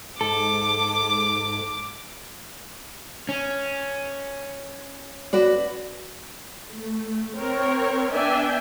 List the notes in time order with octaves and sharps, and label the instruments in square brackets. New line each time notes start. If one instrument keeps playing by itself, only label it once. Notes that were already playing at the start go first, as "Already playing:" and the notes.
[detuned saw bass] G#2 [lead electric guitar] A4 [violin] D6
[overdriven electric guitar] C#4
[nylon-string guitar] F#4 B4 D5
[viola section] A3
C4 A#4 C#5
B3 D4 D5 E5 G5 G#5